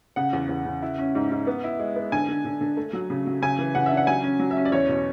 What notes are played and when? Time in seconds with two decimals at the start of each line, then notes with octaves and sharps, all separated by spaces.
0.16 C#3 F#5
0.33 E2
0.49 E2
0.66 C#3
0.82 E4
0.99 C#4
1.15 G#2
1.31 G#2
1.47 B3
1.64 E4
1.79 G#3
1.96 B3
2.12 D3 G#5
2.29 D3
2.45 D3
2.61 D3
2.77 A3
2.93 F#3
3.10 C#3
3.27 F#3
3.42 C#3 G#5
3.59 E3
3.75 C#3 F#5
3.86 E5
3.92 D4
3.97 F#5
4.07 F#3 G#5
4.23 C#4
4.39 F#3
4.51 E5
4.57 C#4
4.65 D5
4.72 E2 C#5
4.88 B2